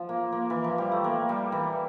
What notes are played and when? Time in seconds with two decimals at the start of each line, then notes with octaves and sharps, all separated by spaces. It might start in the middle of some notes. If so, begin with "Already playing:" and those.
Already playing: F3
0.09 A#3
0.32 A#3
0.50 E3
0.64 F3
0.78 G3
0.92 A3
1.04 A#3
1.29 G3
1.52 E3